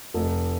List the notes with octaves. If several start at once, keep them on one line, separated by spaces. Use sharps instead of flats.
F1